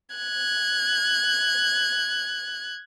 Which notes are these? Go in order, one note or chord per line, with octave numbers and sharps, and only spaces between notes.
F#6 G#6